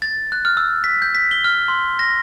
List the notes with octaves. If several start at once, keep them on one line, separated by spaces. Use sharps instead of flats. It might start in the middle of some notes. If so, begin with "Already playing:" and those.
A6
F#6
F6
E6
B6
G6
B6
G7
F6
C6
A#6